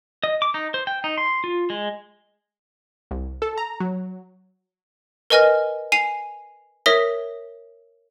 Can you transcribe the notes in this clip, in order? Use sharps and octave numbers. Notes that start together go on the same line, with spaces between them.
D#5
D6
D#4
C5
G5
D#4
C6
F4
G#3
C2
A4
A#5
F#3
A#4 B4 D#5 G#5 F6 A#6
G#5 C7 D#7 F7
A#4 C#5 E5 D#6 A#6 B6